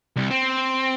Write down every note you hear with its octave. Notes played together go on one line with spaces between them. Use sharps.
C2
C4